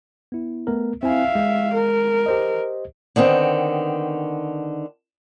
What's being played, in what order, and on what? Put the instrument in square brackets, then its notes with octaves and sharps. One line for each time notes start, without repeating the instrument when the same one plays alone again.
[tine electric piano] B3 E4
A3 B3 A#4
[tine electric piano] C4 E4 G#5 [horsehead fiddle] E5 F5
[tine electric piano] G#3
[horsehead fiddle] A#4
[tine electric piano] G4 C5 D#5
[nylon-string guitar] D3 D#3 B3 C4